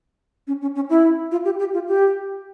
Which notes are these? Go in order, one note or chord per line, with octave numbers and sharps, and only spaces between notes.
C#4
C#4
C#4
E4
F4
G4
G4
F4
G4